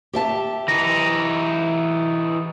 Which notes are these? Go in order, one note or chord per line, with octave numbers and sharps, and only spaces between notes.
G4 E5 A5
E3 D#4 A#6